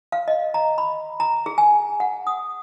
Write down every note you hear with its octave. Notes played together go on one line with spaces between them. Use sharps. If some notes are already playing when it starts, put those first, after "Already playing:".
F5
D#5
A#5
B5
A#5
G#4
G#5
F#5
D#6